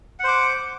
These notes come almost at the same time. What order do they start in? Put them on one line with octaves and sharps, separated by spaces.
F#5 C5 D6